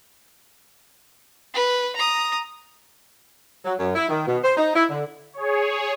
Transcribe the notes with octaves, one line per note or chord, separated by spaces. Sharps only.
B4
A#5 D#6
F#3
F#2
E4
D#3
B2
C5
D#4
E4
D3
G#4 C#5